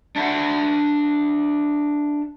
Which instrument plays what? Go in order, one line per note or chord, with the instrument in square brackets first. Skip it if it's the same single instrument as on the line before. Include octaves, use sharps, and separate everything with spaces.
[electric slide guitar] D4 E5 F#5